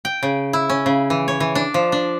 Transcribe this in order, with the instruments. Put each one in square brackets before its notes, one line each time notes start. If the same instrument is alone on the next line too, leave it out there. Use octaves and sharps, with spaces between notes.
[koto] G5
C#3
E4
C#4
C#3
E3
C#5
E3
D4
F3
D4